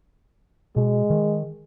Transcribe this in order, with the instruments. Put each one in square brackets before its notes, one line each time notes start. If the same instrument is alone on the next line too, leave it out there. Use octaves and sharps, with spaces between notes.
[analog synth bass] B2 [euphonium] G#3
[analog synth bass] D#3